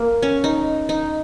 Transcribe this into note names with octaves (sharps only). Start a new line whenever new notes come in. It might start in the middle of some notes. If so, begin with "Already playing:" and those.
Already playing: A#3
C#4
D#4
D#4